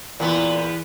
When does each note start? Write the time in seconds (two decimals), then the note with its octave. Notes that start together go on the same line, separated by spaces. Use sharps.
0.20 E2 A#2 B3